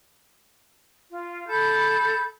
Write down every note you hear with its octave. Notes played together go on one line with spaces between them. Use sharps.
F4
A4 B5 G6